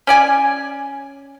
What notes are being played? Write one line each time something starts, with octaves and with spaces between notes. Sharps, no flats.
C#4 D5 G#5